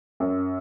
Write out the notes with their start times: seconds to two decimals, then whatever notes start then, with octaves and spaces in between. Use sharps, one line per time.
0.20 F#2